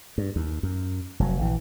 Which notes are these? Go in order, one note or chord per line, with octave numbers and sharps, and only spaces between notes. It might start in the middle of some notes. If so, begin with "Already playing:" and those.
G2
D#2
F#2
F1 C3 F#3
A#1 E3